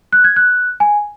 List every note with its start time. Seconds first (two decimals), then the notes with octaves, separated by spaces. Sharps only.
0.13 F#6
0.24 G#6
0.36 F#6
0.80 G#5